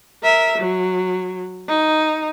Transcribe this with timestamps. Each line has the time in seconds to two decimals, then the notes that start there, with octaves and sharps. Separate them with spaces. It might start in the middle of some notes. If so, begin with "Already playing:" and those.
0.24 A#4 E5
0.58 F#3
1.68 D#4